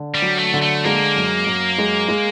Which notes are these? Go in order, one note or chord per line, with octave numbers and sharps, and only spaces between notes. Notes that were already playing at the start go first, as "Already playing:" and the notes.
Already playing: D3
G3
F#3
A3
D3
A3
G#3 A#3
F#2
F#2
G#3
G#3